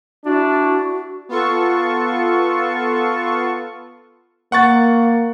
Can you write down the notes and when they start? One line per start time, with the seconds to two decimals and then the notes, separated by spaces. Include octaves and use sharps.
0.25 D4 E4 F#4
1.29 B3 F4 A4 C#6
4.52 A#3 F#5 C#6 A6